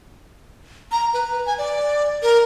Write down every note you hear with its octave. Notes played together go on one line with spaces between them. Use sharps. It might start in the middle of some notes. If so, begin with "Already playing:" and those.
A#5
B4
G#5
D5
A#4